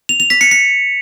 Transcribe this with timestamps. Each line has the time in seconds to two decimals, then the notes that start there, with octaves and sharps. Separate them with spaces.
0.09 F7
0.20 F7
0.30 B6
0.41 C#7
0.51 C#7